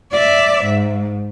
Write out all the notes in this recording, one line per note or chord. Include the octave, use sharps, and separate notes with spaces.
D5 E5
G#2